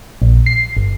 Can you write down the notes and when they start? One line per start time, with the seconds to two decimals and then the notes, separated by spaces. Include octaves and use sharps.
0.22 A#1
0.46 C7
0.77 G1